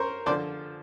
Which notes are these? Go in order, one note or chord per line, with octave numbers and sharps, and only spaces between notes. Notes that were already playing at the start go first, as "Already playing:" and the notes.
Already playing: A#4 C5 C#5
D3 F3 C5 D5